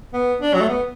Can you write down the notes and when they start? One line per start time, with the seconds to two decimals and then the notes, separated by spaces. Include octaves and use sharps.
0.14 B3
0.41 D4
0.54 F#3
0.61 A3
0.69 B3